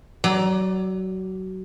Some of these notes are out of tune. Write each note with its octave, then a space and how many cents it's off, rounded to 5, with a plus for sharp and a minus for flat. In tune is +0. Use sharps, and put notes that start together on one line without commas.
F#3 +25 D5 +0